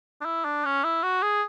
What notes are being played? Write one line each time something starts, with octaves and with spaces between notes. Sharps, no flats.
D4
E4
D4
C#4
E4
F#4
G#4